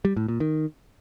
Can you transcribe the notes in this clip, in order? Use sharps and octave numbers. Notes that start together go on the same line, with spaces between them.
G3
A2
A#2
D#3